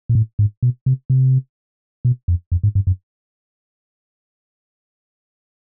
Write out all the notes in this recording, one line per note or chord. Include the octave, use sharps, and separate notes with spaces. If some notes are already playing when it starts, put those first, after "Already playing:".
A#2
A2
G#2
B2
C3
C3
B2
F2
F2
G#2
G2
F#2